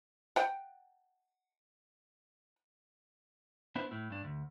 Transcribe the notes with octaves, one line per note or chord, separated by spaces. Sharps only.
F#5 G5
B3 D4 E4 B4 C5
A2 E4
G2 D4
D2